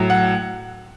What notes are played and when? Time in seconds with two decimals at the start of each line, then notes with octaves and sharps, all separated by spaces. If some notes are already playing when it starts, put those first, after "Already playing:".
Already playing: A2 F#3
0.10 F#5